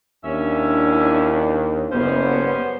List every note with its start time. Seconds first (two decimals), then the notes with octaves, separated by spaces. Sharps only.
0.24 D#2 C#4 D4 E4 E5
1.91 F#1 F#2 G3 B3 C#4 C5